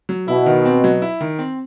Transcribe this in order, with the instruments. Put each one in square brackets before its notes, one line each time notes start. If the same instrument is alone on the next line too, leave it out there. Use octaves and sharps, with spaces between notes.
[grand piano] F#3
[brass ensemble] B2 [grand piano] E4
[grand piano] D#3
C4
F#3
E4
D#3
C4